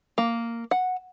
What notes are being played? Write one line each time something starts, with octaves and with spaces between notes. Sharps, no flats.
A#3
F#5